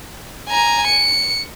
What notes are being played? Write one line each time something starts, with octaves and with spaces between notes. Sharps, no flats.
G#5 A#5
C#7